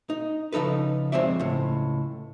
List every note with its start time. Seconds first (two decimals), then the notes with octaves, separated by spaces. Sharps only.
0.10 D#4
0.53 C#3 F3 D#4 A4 B4
1.12 F3 G#3 C4 C#5 D5 E5
1.40 C#2 A2